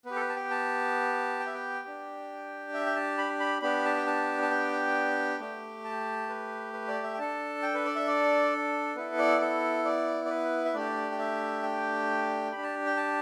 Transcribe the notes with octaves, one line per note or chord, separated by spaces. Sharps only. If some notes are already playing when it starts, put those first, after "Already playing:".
B3 G4 B4
A4
B4
A5
G5
A5
G5
E5
G5
D4 G4
E5
G5
A5
B5
B5
B3 D4 G4 B5
A5
G5
A5
A5
G5
A3 G4
A5
B4
B4
D5
E5
G5
D4 A4 A5
G5
B4
D5
E5
D5
B3 E4 A4 B4
D5
A4
D5
D5
B4
E5
A3 D4 G4 D5
G5
E5
G5
D4 G4 B5
A5
G5
A5